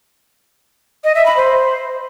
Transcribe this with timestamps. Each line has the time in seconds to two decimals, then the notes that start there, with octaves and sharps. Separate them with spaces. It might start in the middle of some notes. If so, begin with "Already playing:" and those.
1.04 D#5
1.15 E5
1.26 B5
1.37 C5